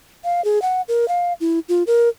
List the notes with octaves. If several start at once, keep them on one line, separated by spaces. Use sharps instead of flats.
F5
G#4
F#5
A#4
F5
E4
F4
A#4